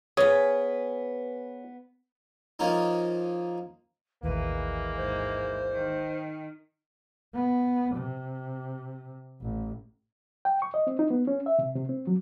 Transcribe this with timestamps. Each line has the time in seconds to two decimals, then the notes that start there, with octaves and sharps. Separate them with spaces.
0.17 B3 C#4 G#4 B4
2.59 F3 A#3 C#4 D#4
4.23 A1 D#2 E3 G#3 A#3 B4
4.96 G#2 C5
5.72 D#3
7.34 B3
7.94 C3
9.41 A1
10.45 G5
10.62 C#6
10.74 D#5
10.87 C4
10.99 D#4
11.10 B3
11.27 C#4
11.46 E5
11.59 C3
11.75 C3
11.89 C4
12.07 F#3